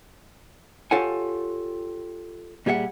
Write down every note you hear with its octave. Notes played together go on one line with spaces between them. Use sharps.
F4 G4 A4 C#5 F#5 G#5
A#2 G3 G#4 E5 F#5